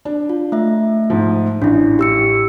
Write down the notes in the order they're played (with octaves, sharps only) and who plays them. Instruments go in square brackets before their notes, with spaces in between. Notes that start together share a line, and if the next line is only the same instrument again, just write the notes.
[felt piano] D4
[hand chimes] F4
A3 E5
[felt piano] G#2 F3
[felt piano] A1 [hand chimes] D4 E4
[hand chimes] G4 E6 C#7